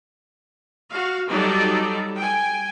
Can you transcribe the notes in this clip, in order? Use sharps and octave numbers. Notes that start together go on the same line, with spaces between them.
F#4 F5
F#3 G3 D#4 A4 D5
G5 G#5